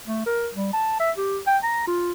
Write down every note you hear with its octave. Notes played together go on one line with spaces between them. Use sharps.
A3
A#4
G3
A5
E5
G4
G5
A#5
F4